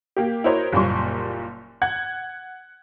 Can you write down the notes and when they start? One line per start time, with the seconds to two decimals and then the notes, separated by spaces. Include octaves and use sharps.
0.16 A#3 G4
0.44 E4 F#4 A#4 C5 C#5 D#5
0.72 F#1 A#2 G3 F4 C6 C#6
1.82 F#5 G#6